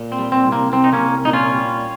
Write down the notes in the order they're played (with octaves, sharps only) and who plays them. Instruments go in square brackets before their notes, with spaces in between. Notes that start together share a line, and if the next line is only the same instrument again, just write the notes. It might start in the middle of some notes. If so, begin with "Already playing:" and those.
Already playing: [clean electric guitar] A#2
C4
G3
C4
C2
A#3
C2 C4
D#4
A#3 C#4
C2
A#2 D#4
C#4 F4
G3